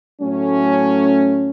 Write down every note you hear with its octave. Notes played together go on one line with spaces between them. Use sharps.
A2 F#3 A3 C#4